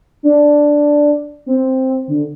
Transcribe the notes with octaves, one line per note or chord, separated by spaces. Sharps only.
D4
C4
D3